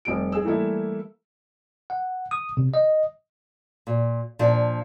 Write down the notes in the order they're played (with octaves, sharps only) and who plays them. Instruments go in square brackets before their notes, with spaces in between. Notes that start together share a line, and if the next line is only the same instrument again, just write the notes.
[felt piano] F1 G3 D7
G#4 E6
E3 G3 A3 A#3 E4
[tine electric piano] F#5
D#6
C3
D#5
[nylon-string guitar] A#2
A#2 F3 D4